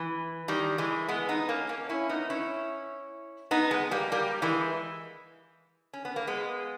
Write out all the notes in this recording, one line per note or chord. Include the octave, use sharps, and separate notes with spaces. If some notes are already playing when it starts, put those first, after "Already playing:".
Already playing: E3
D#3 G3
E3 G#3
G#3 B3
B3 D#4
A#3 C#4
A#3 C#4
C#4 E4
B3 D#4
C#4 E4
B3 D#4
G#3 B3
G3 A#3
G3 A#3
E3 G#3
C#4
B3
A#3
G#3 B3